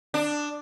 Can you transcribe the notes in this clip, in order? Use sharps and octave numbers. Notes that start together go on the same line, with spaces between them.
D4